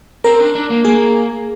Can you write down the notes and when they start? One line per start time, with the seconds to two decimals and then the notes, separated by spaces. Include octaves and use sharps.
0.24 C4 A#4
0.39 D4
0.55 D4
0.70 A#3
0.84 A#3 G#4